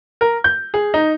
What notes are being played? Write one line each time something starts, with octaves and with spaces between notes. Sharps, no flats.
A#4
G6
G#4
D#4